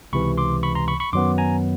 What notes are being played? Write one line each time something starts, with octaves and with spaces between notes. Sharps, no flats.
C#2 C3 E3 B5 C#6
C6 D6
B5 C#6
A#5 C6
B5 C#6
B5 C#6
F#2 D#3 F#3 B3 C6 D6
G#5 A#5